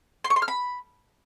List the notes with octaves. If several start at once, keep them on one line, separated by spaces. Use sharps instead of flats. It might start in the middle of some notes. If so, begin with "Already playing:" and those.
C6
C#6
C6
F6
B5